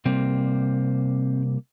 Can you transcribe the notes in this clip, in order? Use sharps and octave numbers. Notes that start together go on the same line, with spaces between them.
C3 G3 A#3 C4